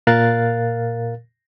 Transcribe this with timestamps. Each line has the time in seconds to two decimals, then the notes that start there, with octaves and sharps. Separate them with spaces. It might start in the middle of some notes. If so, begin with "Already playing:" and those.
0.07 A#2 A#4 F5 F#6 A6